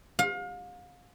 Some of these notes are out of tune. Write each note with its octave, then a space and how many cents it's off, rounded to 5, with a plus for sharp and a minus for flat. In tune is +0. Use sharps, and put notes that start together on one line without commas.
F5 +35